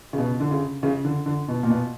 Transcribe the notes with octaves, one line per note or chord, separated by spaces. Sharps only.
C#3
B2
D3
C#3
C#3
D3
D3
B2
A#2
B2